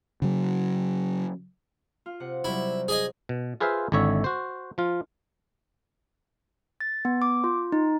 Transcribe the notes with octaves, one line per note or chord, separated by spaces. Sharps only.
C#3 F#3
F4
C3 F#5
C3 F#3 G3 E4
G#4 D#5 G#5
B2
F4 G#4 B4 C5 E5 F5
G#1 D3 E4 C#5 E5
F#4 C5
F3 F4
A6
B3
D6
F4
D#4